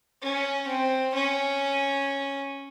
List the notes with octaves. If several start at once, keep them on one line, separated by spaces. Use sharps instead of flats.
C#4
C4
C#4